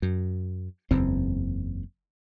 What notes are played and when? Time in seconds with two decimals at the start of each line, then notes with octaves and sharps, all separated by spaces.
0.02 F#2
0.91 F#1 E2 C4